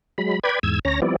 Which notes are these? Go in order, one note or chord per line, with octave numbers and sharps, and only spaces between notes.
F#3 G#3 B5
B4 D5 G5 B5 G#6
E2 G#2 E6 G#6
D2 C#4 C#5 A#5 A#6
F3 G3 B3 C4 E4 D5